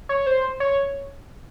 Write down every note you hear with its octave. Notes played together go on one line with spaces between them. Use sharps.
C#5
C5
C#5